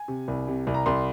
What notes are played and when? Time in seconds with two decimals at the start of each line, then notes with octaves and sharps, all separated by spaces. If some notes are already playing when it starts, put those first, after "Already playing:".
Already playing: G#5
0.08 C3
0.28 C2
0.48 C3
0.67 C2
0.74 A#5
0.86 C2 C6